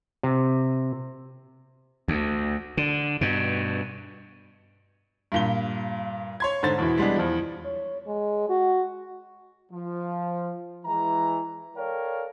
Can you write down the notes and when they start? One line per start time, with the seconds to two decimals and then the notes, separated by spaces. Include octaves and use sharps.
0.23 C3
2.08 D2
2.77 D3
3.21 G2 B2
5.32 G2 A#2 G7
6.40 C#5 C6 G#6
6.63 G#2 D3 C5 A6
6.78 E2 B2 E3
6.98 G3 G#3 B3 D4
7.16 E2 F3
7.65 C#5
8.07 G#3
8.49 F#4
9.72 F3
10.86 E3 G#3 A#5
11.76 A4 A#4 C#5 D5 F5 G5